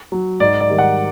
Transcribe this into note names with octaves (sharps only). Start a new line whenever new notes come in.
F#3
G#2 D5
D5
D#3 G3
F#5